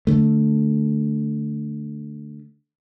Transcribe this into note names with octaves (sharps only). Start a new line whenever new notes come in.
D3 A3